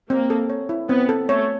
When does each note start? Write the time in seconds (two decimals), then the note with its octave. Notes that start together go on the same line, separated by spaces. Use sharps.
0.10 A#3 C4
0.30 A4
0.50 C#5
0.69 E4
0.89 B3 C4
1.09 A4
1.29 A3 C#5